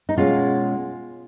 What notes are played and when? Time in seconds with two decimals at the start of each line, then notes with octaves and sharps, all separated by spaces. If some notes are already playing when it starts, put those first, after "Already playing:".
0.09 D#4
0.17 B2 G#3 C#4 F4